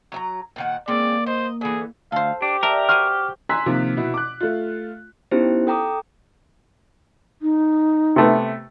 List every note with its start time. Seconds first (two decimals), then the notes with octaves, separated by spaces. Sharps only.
0.12 F#3 E5 A#5
0.56 A#2 D#3 F#5
0.88 G#3 A#3 C4 C#4 D5
1.26 C5 D#5
1.61 D3 E3 G#4
2.12 D2 A4 C5 F5
2.42 D4 G4
2.63 A#4 D5 E5 A5
2.89 F#4 C5 G#5 F6
3.49 G#5 A#5 C6 E6 F#6 B6
3.66 C3 D#3 F3 A#3 C4 F4
3.97 B2 E4
4.14 D6 F#6
4.40 A3 F4
5.31 B3 C#4 D#4 E4 G4 C5
5.67 A4 G5 A#5 D6 D#6
7.42 D#4
8.16 C3 A3 B3